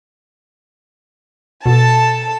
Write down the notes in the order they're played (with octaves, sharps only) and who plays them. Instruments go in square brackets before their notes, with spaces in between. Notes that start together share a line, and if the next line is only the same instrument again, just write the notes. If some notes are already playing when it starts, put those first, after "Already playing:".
[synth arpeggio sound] B2 [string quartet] A4 A5